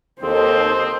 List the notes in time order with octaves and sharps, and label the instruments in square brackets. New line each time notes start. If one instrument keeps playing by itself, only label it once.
[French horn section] D#2 A4 [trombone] C4 [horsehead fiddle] C5 D#5